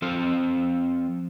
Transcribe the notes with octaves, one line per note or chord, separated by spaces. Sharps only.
F3 C4 F4 A4 C5